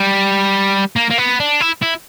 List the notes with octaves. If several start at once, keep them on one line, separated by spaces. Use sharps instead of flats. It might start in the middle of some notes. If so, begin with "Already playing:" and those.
Already playing: G3
A#3
A#3
B3
D4
E4
E4